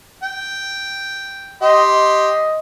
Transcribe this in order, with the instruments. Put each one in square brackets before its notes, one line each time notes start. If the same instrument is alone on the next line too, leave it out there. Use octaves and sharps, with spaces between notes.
[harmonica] G5
[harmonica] G4 C6 [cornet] D#5
[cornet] D#5